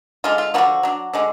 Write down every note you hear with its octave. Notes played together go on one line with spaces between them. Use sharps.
D3 G#3 D4 F4
F4
D3 F3 B3 D4 F#4
F#3 D4
D3 G#3 D4